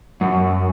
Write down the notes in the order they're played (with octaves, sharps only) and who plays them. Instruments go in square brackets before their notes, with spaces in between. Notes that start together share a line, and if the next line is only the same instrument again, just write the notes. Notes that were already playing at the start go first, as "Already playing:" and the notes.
[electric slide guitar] F#2